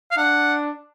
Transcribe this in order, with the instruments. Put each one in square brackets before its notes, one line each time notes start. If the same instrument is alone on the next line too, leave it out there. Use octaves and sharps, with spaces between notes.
[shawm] F5
[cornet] D4 [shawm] F#5